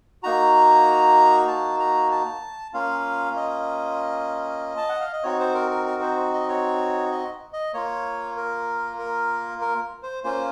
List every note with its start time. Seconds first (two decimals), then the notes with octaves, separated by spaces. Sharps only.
0.23 A#3 D#4 F#4 A#5
1.48 A5
1.80 A#5
2.11 A5
2.74 A#3 C#4 F4 F5
3.37 D#5
4.77 A5
4.89 F#5
5.01 F5
5.13 D#5
5.23 C4 D#4 F#4 C#5
5.40 C5
5.54 A#4
5.71 A#4
5.86 A#4
6.02 C5
6.33 D#5
6.49 C#5
7.11 D#5
7.53 D#5
7.74 A#3 F4 C#5
8.37 A#4
8.99 A#4
9.61 A#4
10.03 C5
10.24 A#3 C#4 F4 C5